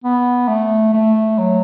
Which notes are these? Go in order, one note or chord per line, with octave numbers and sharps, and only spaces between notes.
B3
A3
A3
F#3